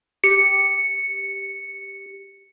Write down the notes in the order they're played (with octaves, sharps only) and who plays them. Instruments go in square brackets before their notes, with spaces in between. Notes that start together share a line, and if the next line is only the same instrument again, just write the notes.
[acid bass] G4 [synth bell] C#7